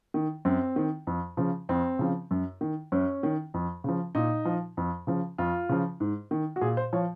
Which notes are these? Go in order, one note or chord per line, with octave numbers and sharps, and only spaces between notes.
D#3
F#2 C4
D#3
F2
C#3 F3
F2 C4
C#3 F3
F#2
D#3
F#2 C#4
D#3
F2
C#3 F3
A#2 D#4
F3
F2
C#3 F3
F2 F4
C#3 F3
G#2
D#3
F#4
A#2 G#4
C5
F3 C#5